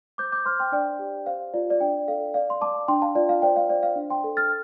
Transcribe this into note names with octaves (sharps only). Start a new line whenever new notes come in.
C5 D6 G6
D6 G6
C5 C6 F6
G5 C6
D4 D5 G5
G4
C5 F5
F4 D5
D5
D4 D5 G5
A4 F5
D5 F5
C6
D5 A5 D6
D4 G5 C6
F5 A5
F4 D5
F5
C5 D5 G5
F5
C5 D5
F5
D4
G5 C6
A4
F6 A6